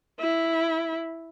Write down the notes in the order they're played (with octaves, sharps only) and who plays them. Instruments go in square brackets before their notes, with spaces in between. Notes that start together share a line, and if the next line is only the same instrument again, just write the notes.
[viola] E4